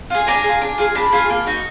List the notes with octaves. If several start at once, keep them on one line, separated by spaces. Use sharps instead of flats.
F4 G#4
D4 G#5 A#5
F4 G#4
D4
F4 G#4
D4 A5 B5
F4 G#4
A#3
D#4 F#4